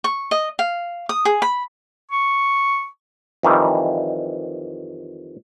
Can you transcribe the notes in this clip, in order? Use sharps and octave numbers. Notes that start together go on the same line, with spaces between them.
C#6
D#5
F5
D#6
G#4
B5
C#6
F2 D#3 E3 G3